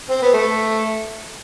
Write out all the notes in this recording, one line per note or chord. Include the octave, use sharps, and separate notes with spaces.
C4
B3
A3